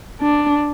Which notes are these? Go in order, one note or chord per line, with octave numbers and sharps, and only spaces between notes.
D4